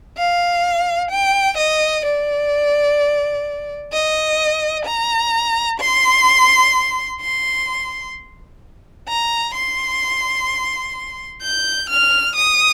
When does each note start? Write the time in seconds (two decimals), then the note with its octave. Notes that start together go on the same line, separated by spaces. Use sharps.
0.17 F5
1.11 G5
1.57 D#5
2.05 D5
3.93 D#5
4.85 A#5
5.80 C6
7.21 C6
9.08 A#5
9.54 C6
11.42 G6
11.90 F6
12.36 D#6